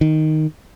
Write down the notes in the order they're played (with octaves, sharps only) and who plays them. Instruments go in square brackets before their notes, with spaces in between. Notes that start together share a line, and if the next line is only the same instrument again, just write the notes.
[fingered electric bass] D#3